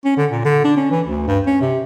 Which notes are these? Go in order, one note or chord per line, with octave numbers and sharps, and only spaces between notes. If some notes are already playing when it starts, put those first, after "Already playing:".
C#4
D3
A#2
D3
D4
C#4
E3
D2
G2
C#4
C3